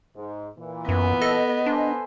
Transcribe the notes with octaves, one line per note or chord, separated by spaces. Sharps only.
G#2
A#2 E3
F#2 B3
A4 D#5
D4 A4 C5 G#5